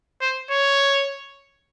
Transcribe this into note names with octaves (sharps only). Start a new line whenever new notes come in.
C5
C#5